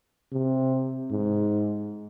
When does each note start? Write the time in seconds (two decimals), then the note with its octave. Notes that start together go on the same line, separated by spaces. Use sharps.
0.32 C3
1.11 G#2